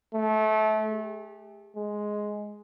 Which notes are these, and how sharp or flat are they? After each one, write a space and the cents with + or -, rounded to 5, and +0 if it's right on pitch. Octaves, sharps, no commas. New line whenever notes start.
A3 -25
G4 +45
G#3 +5